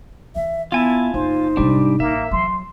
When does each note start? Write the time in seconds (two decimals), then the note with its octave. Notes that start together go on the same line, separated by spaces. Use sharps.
0.35 E3 D#4 E5
0.72 B3 E4 F4 G#5 A5
1.14 F#1 D#4 C5
1.57 G#2 C3 G3 D4
2.00 A1 A#3 E5
2.31 E3 F#3 C6